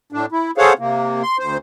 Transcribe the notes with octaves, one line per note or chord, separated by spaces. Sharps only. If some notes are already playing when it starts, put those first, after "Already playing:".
A2 D4
E4
G#4 A4 C5 C#5 F5 F#5
C3 A#3
C6
D2 C5